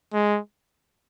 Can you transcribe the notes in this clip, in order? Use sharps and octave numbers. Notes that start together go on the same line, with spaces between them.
G#3